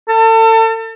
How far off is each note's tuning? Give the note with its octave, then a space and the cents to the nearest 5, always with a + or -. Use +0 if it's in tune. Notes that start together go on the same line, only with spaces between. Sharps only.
A4 +35